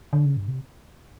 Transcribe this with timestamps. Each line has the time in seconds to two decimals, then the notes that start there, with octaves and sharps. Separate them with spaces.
0.13 D3
0.25 C#3
0.36 G2
0.48 C3